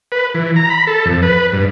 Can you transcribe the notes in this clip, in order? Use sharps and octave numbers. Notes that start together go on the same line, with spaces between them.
B4
E3
A#5
B5
A4
F2
B4
G2